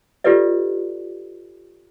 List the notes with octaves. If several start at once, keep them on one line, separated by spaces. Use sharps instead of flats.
F4 G4 A4 B4 D5 D#5